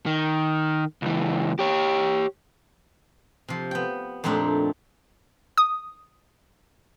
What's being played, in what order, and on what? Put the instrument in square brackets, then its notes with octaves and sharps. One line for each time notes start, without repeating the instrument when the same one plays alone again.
[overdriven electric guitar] D#3
C#2 E3
G4 C#5
[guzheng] C3 F3
B3 G5
F2 A#2 A3 C4 D4 D#4
[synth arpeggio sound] D#6